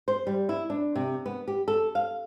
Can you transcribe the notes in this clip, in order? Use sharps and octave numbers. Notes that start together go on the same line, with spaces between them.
C5
G3
E4
D4
C3
B3
G4
A4
F5